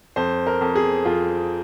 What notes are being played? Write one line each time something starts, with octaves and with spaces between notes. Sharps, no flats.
F2 C5
A#4
F2
G#4
F2 F4